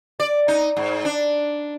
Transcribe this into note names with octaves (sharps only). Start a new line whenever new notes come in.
D5
D#4
G#2
D4